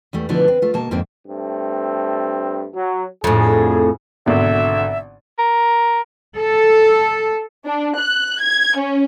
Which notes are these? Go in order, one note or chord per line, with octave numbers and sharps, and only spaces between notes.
E2 G3 A3
B2 D3 F3 A3 B3 E4
C4 B4
A3 F4
B2 A#3 A5
F2 G#2 D3 A#3 C4 A4
G2 A3 C4
F#3
F2 A2 D3 G#4
G#1 B2 D3 E5
A#4
A4
D4
F#6
G#6
C#4